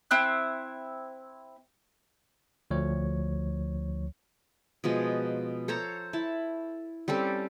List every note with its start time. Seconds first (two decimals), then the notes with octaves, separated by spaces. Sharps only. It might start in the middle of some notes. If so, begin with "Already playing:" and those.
0.11 C4 E4 F#6
2.71 D2 F3 C#5
4.84 B2 F3 G#3 G#5
5.68 A4 C5 C#5 A#5
6.13 E4 A5
7.08 G3 C4 C#4 A4